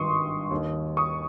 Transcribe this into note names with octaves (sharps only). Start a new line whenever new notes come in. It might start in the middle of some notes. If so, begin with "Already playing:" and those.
Already playing: G#1 G2 D#3 C6 C#6 D#6
D#2
D#3
C#6 D#6